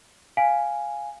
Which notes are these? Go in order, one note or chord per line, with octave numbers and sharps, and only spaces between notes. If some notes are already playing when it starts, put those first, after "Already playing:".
F5 G#5